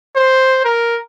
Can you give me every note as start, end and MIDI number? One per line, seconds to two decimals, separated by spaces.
0.16 0.62 72
0.65 0.97 70